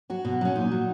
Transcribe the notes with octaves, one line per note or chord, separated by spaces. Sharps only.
F#3 F#4
B2
F#3 C#4
A#2 D#4
F#3